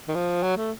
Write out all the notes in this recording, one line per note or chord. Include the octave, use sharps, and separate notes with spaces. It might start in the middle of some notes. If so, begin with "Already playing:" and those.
D#3
F3
F#3
A3